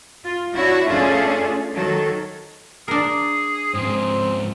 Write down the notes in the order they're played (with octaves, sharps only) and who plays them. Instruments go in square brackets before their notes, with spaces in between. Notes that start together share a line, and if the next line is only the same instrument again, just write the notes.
[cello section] F4
D4 E4 F#4 C#5 E5
A3 C#4 D4 F4 G#4 A4
D#3 F#3 A4
[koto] D4 A#4 [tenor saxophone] G#4
[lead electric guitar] G#2 F3 [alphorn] C4